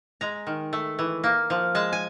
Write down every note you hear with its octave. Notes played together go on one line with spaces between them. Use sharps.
G#3 A#5
D#3
A3
E3
A#3
F3
G#3 A5
G#5